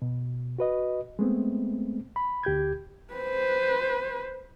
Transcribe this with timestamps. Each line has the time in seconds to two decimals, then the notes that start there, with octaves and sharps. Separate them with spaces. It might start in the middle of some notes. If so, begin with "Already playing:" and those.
0.02 B2
0.58 F#4 B4 D#5
1.19 G#3 A3 B3 C4
2.16 B5
2.43 D2 G4 G6 G#6
3.14 B4 C5